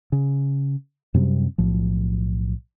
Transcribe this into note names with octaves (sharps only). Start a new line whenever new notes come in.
C#3
F#2 C3 G3 C4
B1 A2 F3